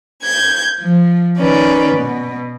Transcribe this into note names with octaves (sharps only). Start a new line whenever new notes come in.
G6 G#6
F3
D#3 C#4 B4 D5
B2